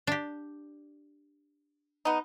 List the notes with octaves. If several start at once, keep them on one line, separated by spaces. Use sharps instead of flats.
D4 G4
B3 D#4